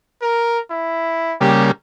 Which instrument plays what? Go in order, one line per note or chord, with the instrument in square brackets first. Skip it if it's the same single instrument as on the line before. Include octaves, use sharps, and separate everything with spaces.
[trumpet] A#4
E4
[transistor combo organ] C#3 G3 A#3 [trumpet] G4